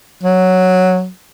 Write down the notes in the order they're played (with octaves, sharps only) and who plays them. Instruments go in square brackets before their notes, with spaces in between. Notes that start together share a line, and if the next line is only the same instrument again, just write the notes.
[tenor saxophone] F#3